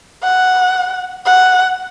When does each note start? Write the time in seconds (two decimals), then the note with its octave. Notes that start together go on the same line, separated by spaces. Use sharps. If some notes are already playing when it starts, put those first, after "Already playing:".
0.23 F#5
1.26 F#5